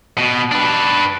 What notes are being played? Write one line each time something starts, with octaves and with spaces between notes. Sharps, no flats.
B2
D4 B4